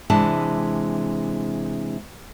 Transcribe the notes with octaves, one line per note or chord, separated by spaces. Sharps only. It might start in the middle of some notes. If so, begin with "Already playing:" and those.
C3 E3 G#3 D4 A5